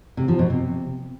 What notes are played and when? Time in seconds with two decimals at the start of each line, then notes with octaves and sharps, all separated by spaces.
0.17 C3
0.28 F3
0.39 B2
0.50 C3